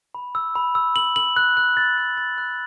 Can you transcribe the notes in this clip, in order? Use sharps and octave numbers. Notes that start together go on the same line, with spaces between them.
B5
E6
B5
E6
F#7
F#7
F#6
F#6
A6
F#6
A6
F#6